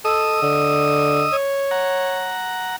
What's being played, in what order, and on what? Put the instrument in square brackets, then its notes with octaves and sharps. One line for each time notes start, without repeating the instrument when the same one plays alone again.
[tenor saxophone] A4 [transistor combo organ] D#5 D#6 E6
[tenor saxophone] D3
C#5
[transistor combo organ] F#5 A#5